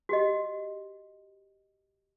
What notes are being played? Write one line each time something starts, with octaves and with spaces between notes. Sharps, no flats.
F#4 G4 D#5